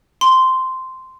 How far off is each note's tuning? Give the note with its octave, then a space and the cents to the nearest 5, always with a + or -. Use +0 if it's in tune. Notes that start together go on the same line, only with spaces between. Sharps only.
C6 -10